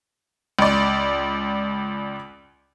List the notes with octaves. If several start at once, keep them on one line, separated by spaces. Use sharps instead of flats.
C#2 D5